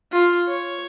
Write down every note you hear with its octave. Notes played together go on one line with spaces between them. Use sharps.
F4
C#5